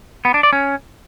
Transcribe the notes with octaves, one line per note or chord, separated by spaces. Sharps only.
B3
D4
D5
C#4